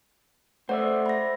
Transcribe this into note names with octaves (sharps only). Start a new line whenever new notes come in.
A3 C5 D5 E5 F#5
B5 A#6